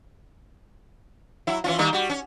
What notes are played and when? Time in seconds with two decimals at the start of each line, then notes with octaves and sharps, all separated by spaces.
1.47 F#3 E4
1.64 E3 C#4 F4
1.79 D#3 G3 A#3
1.93 G3 F#4
2.09 C#4